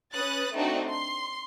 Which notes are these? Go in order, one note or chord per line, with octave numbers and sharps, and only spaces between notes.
C#4 B4 D#6 F#6 A6
A3 C4 D4 D#4 F#4
C6